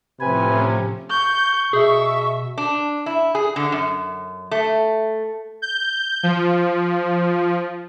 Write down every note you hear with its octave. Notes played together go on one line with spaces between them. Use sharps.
A2 C3 F3 C#4 B4 G#5
C#6 G6
B2 G#4 E5
D4
E4
G#4
D3
F#2
A3
G6
F3